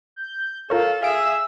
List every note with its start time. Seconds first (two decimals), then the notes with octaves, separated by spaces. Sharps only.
0.16 G6
0.70 F4 A4 A#4 C#5 F5
1.03 G#4 E5 F5 E6 D7